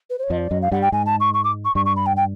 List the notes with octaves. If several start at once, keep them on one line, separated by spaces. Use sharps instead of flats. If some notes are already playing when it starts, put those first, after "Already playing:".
B4
C5
C#5
F2 F3 D#5
D5
F#2 F#3 D#5
F5
G2 G3 F#5
G5
G#2 G#3 G#5
A5
C#6
C#6
D6
C#6
G2 G3 C#6
C#6
B5
G5
G5